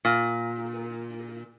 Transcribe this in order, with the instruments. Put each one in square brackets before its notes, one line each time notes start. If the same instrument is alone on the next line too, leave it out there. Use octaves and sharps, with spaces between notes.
[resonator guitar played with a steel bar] A#2